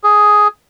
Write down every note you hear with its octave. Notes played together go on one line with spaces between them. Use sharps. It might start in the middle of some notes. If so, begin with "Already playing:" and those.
G#4